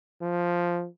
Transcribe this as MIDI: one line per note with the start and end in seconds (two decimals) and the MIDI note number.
0.21 0.87 53